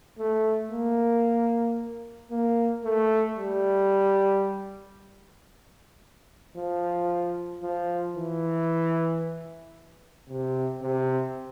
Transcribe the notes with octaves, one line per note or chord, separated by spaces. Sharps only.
A3
A#3
A#3
A3
G3
F3
F3
E3
C3
C3